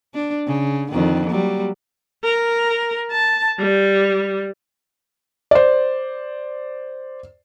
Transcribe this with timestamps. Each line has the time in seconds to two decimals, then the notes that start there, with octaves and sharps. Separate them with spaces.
0.14 D4
0.47 C#3
0.91 F2 D3 D#3
1.28 F#3 G3 A#3
2.24 A#4
3.11 A5
3.59 G3
5.51 C5 D5